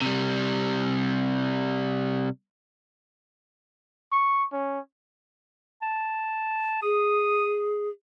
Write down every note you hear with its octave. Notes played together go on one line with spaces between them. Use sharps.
C3 G3
C#6
C#4
A5
G#4 D#6